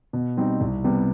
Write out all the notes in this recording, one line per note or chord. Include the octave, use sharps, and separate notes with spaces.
B2
G3 C4 D#4
C2
C3 G3 B3